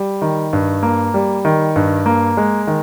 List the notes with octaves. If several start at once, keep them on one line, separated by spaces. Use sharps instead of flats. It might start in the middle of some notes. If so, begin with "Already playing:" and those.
Already playing: G3
D#3
G2
A#3
G3
D#3
G2
A#3
G#3
D#3